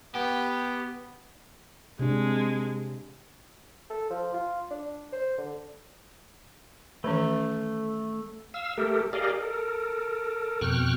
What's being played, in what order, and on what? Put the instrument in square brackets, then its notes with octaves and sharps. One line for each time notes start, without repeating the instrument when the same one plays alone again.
[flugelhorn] B3 [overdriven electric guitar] G4
[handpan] C3 D4 [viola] G#3
[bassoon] A4
F3
F4
D4
C5
D3
[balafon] D#3 E3 C#4 [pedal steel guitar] A3
[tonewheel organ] F5 E6
A3 G4 A4 A#4
G4 G#4 A#4 D5 D#5 F5
A4 A#4
F2 B2 G5 C#6 F6 F#6